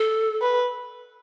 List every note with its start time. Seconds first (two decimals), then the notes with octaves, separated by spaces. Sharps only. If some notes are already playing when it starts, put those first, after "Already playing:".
Already playing: A4
0.41 B4